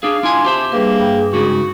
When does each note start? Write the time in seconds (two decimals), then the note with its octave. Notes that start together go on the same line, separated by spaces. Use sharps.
0.03 D4 G#4 F5
0.23 D4 E4 F4 G#5 C6
0.45 G4 C5 E5 A5
0.72 G3 A#3 D4 G#4 B4
1.00 G2 G5 G6
1.33 C#2 G#2 C#3 F#4